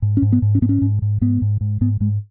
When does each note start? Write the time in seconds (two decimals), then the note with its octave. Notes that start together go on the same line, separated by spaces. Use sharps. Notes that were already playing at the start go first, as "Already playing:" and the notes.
0.02 G#2
0.17 C#4
0.22 G#2
0.32 B3
0.42 G#2
0.55 C#4
0.62 G#2 B3
0.69 C#4
0.82 G#2
1.02 G#2
1.21 G#2 B3
1.42 G#2
1.61 G#2
1.81 G#2 B3
2.00 G#2 G#3